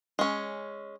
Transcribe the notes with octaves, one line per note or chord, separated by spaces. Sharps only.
G#3 C#4